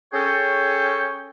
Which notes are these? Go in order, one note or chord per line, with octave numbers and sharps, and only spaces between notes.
C#4 G#4 A4 C#5 G5